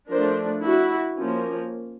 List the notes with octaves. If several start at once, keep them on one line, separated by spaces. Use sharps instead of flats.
F3 A3 D4 A#4 C5
E4 F#4
F3 A#3 C#4